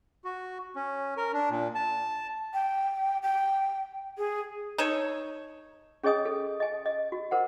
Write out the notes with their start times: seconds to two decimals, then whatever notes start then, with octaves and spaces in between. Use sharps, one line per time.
0.24 F#4
0.76 C#4
1.17 A#4
1.33 D4
1.50 A#2
1.75 A5
2.54 G5
3.23 G5
4.18 G#4
4.78 D#4 A4 C#5
6.03 C#4 G#4 C#5 D#5 G#5 D#6
6.25 A4
6.60 D#5 G#5
6.86 D#5
7.12 F#4
7.31 A#4 C5 F#5